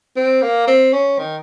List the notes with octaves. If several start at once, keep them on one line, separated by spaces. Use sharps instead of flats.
C4
A#3
C4
C#4
D#3